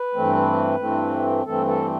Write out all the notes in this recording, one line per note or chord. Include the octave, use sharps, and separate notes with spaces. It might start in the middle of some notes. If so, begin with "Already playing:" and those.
Already playing: B4
G2 E3 A3 C4
G2 E3 A3 C4
G2 E3 A3 C4 A4
A4